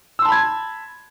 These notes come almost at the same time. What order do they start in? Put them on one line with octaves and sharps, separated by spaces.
E6 C6 A5 B5 G#6